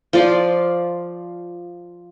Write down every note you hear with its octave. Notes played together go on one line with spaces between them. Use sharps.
F3 F4 D5